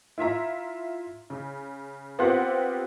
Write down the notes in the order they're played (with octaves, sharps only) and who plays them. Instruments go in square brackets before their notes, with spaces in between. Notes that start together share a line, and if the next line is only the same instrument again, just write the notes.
[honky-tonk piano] E4 F4 E5 A#5
C#3
B3 C4 F4 G4 A#4 F#5